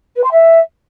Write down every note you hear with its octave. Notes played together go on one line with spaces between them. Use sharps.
B4
C6
E5